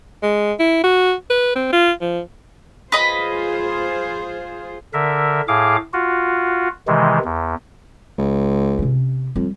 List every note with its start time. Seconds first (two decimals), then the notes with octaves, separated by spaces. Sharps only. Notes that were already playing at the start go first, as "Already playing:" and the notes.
0.23 G#3
0.60 E4
0.84 F#4
1.30 B4
1.55 C4
1.73 F4
2.01 F3
2.92 F4 G#4 B4 C5 D#5 B5
4.94 D3 A#4 E5
5.48 A2 G#4 F5 D6
5.93 F4 F#4
6.87 C3 D#3 E3 G#3
7.25 E2
8.18 C#2
8.79 C3 C#4
9.36 F2 G3